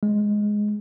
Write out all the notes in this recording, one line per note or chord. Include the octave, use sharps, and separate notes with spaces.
G#3